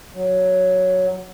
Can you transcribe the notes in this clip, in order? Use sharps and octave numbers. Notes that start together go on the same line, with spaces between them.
F#3